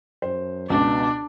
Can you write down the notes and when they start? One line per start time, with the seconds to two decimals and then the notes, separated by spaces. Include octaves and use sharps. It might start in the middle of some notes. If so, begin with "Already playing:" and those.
0.22 F#2 C5
0.70 C#2 B2 D4